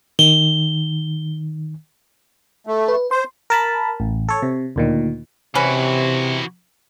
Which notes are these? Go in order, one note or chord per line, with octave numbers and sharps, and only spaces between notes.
D#3 G7
A3
B4
C5 C6
A#4 A5 B5
A1
A4 C#5
C3
D2 A#2 D#3
C3 E3 C#4 F#4 B4